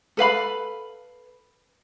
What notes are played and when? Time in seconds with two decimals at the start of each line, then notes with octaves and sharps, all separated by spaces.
0.17 A4 B4 F5 B5